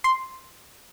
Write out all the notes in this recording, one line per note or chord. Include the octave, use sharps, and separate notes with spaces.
C6